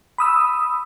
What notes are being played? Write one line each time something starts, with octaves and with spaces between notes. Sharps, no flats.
B5 D#6 E6